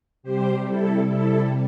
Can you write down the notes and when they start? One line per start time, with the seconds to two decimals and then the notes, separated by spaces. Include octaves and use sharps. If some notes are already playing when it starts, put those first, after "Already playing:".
0.23 C3 G3 G4 C5
0.67 E4 A4
1.10 E4 A4